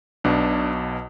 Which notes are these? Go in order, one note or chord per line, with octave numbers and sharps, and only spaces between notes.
B1 B2 D4